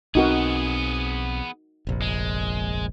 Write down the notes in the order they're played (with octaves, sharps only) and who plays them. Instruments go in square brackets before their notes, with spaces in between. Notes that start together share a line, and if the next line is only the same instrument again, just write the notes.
[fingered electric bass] B1 C4 [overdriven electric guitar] B3 G#4 [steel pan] D#4 F#4 A#4
[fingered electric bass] F1 A#1
[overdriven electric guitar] G#3